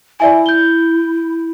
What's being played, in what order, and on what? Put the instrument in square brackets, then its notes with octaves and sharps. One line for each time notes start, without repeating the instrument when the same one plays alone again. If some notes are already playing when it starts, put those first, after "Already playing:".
[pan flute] E4 [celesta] D5 E5 G#5
[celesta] G6 G7